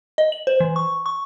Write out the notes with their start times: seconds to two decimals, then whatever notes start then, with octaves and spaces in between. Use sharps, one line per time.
0.18 D#5
0.32 F#7
0.47 C5
0.60 E3
0.76 C#6
1.06 C#6